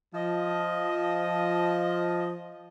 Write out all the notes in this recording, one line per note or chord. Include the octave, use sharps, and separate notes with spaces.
F3 D#5